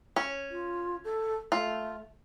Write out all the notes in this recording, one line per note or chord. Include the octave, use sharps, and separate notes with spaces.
C#4
F4
A4
A3 F4